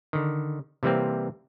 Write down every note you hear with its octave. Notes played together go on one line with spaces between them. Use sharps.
D3 D#3
C3 E3 G3 A#3 C4